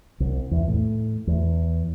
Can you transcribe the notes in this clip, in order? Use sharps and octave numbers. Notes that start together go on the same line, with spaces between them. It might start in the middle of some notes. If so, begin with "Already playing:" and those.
C2
E2
A2
E2